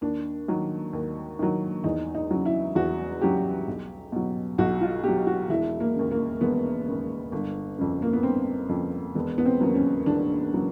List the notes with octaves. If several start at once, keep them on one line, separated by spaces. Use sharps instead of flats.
D#2 D4
D#3 F#3
D#2
D#3 F#3
E2 D#4
D#4
C#3 F#3
E4
E2 F#4
C#3 F#3 G4
B1
B2 F#3
B1 F#4
F4
B2 F#3 G4
F#4
E1 E4
A#3
D#2 C#3
A#3
E1 B3
D#2 C#3
G1
F2 C#3
A#3
B3
G1 C4
F2 C#3
E1 B3
B3
C4
D#2 C#3 F#3
C#4
E1 D4
C#3 F#3